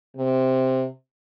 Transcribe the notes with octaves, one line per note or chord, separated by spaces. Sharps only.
C3